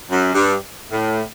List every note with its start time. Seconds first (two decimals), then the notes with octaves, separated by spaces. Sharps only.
0.11 F#2
0.35 G2
0.92 A2